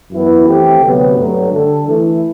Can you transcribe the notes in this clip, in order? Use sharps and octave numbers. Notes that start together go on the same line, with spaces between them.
F#2 E3 B3 E4
E3 A3 C4 G4
D2 C3 F#3 B3
G2 F#3 A3
D3 G3 D4 A4
E3 A3 E4